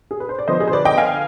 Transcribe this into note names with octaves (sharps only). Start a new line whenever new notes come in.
G#4
B4
C5
D5
D3 F3 B3 C5 D#5
G#4
C5
B4 D5
D#5 G5
F5 G#5